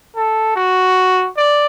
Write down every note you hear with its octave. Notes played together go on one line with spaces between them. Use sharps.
A4
F#4
D5